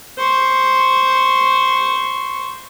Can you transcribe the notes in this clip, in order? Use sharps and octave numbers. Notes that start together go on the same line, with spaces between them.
C5 C#6